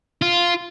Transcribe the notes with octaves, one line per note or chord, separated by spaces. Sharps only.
F4